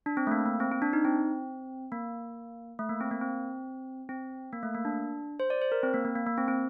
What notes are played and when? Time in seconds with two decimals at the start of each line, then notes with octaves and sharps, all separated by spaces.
0.06 D4
0.17 C4
0.27 A3
0.32 A#3
0.46 A#3
0.60 C4
0.71 C4
0.82 D4
0.93 D#4
1.05 C4
1.92 A#3
2.79 A3
2.89 A#3
3.01 C4
3.11 A#3
3.21 C4
4.09 C4
4.53 A#3
4.63 A3
4.75 A#3
4.85 D4
5.40 C5
5.50 D5
5.62 C5
5.72 A#4
5.83 C4
5.94 A#3
6.05 A#3
6.16 A#3
6.27 A#3
6.38 C4
6.48 C4